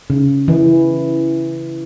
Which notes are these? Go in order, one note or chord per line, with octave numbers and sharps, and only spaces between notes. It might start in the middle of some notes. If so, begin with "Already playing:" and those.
C#3
E3